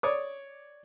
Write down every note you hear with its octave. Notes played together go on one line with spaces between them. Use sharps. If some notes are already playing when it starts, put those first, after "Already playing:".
C#5 D5 D6 D#6